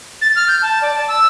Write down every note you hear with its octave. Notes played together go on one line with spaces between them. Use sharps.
A6
F6
G6
A5
D5
A5
E6